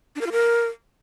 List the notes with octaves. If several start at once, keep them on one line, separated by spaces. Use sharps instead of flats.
D4
A#4
F4
A#4